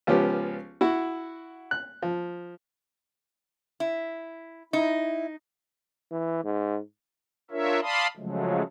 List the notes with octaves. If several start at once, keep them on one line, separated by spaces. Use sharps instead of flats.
C#2 F3 B3 C#4 G4
E4 F#4
F#6
F3
E4
D#4 E4
E3
G#2
D4 F4 A#4 C#5 E5
D5 F5 A5 B5 C6 D#6
C#3 F3 F#3 G#3 A3